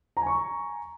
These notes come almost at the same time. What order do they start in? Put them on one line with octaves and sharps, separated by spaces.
A#5 G#5 C#6